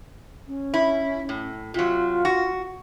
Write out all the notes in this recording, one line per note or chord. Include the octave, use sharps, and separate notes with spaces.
C#4
E4
A2
C3 F#3 F4
F#4